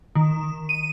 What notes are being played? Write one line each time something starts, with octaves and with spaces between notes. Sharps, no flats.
D#3
D#7